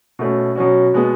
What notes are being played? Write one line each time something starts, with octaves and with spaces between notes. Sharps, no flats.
B2 A3 C#4
B2 F#3 C#4 F#4
B2 G#3 B3